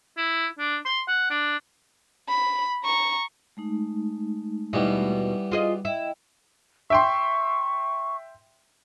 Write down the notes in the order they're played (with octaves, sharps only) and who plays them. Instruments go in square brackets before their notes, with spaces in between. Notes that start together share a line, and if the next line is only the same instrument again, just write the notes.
[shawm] E4
D4
C6
F#5
D4
[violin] B5
A#5 C#6
[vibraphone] G#3 A3 D#4
[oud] D#2 B2 [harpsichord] E3 G3 B3
[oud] F4 G#4 D#5
[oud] E4 [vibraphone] D#5 G5
[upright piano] E5 G5 C6 [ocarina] C#6